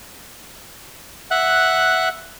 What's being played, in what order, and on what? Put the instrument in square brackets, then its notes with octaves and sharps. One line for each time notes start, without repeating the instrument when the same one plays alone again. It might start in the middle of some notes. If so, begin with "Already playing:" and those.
[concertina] E5 F#5 F#6